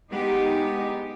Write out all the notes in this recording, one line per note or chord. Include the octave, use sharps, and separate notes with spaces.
G#3 B3 D#4 G4